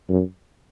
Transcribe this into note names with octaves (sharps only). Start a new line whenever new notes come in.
F#2